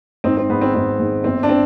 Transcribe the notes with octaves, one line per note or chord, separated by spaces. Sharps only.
G#1 C4 D#4
C4
G#2 D#3 B3
C4
G#1 C4
G#2 D#3
G1 C4
D4
C4